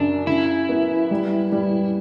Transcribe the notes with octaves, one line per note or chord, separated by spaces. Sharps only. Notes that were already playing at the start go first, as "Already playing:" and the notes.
Already playing: F#2 C#3 D4
C#3 E4
B3
G3
G3